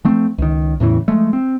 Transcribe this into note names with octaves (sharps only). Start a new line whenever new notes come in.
F3 A3 C4
C#2 D#3
E2 A2 C#3 E3
F3 G#3 A3
C4